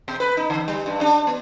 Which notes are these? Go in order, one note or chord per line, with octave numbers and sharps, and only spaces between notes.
B2
B4
D#4
D3
G3
G2
D4
B3